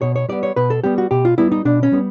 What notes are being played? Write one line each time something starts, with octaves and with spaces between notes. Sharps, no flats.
B2 C#5
C#5
G3 B3 D5
C#5
B2 B4
A4
G3 B3 G4
F#4
B2 G4
F4
G3 B3 E4
D#4
B2 D4
C#4
G3 B3